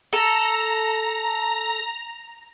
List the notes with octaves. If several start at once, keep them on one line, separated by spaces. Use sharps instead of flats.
A4 A#5